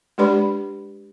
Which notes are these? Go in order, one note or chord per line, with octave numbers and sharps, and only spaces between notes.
G#3 D4 G4 B4 D5 B5